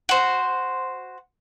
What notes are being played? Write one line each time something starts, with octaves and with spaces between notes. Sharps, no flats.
F#4 C5